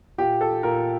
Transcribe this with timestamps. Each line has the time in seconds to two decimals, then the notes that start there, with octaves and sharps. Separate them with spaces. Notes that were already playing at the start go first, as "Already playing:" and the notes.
0.18 A#2 G4
0.41 A4
0.63 A#2 A#4